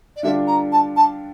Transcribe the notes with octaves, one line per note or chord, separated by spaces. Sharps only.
D5
D3 G3 D4 F4 E5
A#5
A5
A5